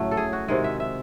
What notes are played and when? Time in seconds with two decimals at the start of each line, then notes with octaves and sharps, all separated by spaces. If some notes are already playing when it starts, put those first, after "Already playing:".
Already playing: A2 C#3 F#3 A3
0.11 A4
0.17 G#4
0.33 F#4
0.48 C3 D#3 G#3 G#4
0.64 E5
0.80 E5